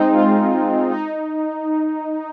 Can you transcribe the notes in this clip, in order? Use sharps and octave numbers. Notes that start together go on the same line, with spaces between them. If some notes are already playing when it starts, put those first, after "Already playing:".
Already playing: G#3 C4 D#4
F4
D#4